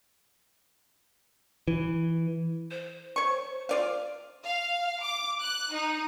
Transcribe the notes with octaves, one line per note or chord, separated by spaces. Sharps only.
E3
C5
C#5 C#6
F4 D5 F5
F5
D6
F#6
D#4